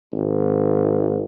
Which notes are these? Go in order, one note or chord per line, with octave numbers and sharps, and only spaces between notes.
G#1